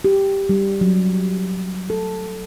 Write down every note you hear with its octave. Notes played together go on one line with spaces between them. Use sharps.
G4
G3
F#3
A4